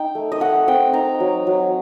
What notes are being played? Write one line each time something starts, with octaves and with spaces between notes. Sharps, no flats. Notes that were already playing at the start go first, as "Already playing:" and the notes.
Already playing: D#4 G5
A3
D#5
A3 F#5
C4 G5
D#4 A#5
F#3
F#3